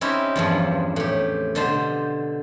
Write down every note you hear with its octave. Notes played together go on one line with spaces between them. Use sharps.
C4 C#4 D#4 E4 G4
E2 G2 F3
A2 G4
B2 D3 G4 C5